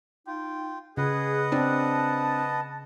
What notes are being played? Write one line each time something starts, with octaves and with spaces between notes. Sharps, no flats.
D#4 F4 G5
C#3 G#4 B4 D#5 F#5
C4 D4 A5